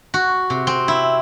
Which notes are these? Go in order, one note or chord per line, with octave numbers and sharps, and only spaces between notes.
F#4
C3
C4
E4